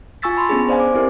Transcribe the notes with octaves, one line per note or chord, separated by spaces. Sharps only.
F4 G#5 C#6 E6 A6 B6
A5 B5 C6
B3 C#4 D4 G#4
C5 D5 F5 G#5
D6
C4 E4 G4 A#4